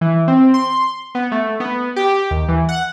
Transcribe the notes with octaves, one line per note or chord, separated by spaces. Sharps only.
E3
C4
C6
B3
A3
B3
G4
D#2
E3
F#5